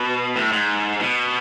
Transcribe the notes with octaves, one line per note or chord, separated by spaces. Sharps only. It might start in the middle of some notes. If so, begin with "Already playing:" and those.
Already playing: B2
A2
G#2
B2